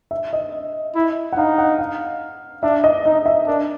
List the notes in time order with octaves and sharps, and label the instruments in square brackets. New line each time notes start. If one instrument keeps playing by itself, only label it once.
[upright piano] E5
D#5
[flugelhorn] E4
[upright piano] F#5
[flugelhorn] D#4 [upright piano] F5
[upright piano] F#5
F5
[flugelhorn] D4 [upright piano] E5
[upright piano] D#5
[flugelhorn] D#4 [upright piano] D#5
[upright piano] E5
[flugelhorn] D4 [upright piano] A#4